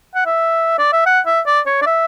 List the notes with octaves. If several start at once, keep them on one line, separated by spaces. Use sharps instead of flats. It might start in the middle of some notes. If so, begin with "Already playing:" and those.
F#5
E5
D5
E5
F#5
E5
D5
C#5
D5
E5